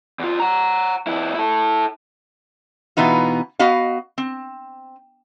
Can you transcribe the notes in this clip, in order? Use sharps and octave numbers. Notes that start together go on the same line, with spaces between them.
E2 F4
F#5 A#5
F2 E4
E4 A4
B2 E3 B3 D#4 F4
B3 F#4 D#5 F5
C4